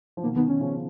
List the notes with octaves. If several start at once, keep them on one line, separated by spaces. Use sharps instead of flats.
F3
B2 D#3 A#3
B2 D#3 B3
B2 D#3 C#4
C#3 F3